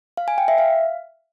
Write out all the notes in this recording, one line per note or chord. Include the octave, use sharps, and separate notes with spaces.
F5
G#5
G5
E5
F5